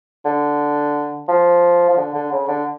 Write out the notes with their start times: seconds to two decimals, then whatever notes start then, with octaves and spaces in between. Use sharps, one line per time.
0.25 D3
1.28 F3
1.89 F3
1.97 D3
2.14 D3
2.32 C#3
2.48 D3